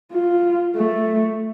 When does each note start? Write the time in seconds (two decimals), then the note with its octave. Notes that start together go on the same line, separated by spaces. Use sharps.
0.13 F4
0.76 A3